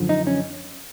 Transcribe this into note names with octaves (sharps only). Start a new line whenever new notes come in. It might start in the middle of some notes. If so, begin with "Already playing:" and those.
Already playing: F#2 D3 F3
D#4
C#4